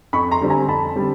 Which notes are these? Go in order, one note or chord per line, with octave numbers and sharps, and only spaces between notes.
F2 B5 C#6
A#5 C6
D3 G3 C4
G#5 A#5
F2 A5 B5
D3 G3 C4